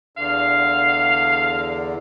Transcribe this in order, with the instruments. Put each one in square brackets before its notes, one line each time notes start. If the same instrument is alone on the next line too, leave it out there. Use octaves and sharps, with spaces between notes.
[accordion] E2 D3 [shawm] F5